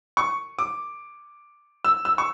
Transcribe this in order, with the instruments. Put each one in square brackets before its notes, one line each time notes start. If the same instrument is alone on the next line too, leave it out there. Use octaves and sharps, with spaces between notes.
[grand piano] C#6
D6
E6
E6
C#6